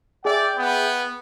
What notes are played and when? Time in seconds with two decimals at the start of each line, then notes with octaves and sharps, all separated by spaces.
0.25 G#4 D5 E5 G5
0.57 B3